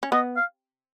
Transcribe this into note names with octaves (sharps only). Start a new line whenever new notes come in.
C#4
B3 D#5
F5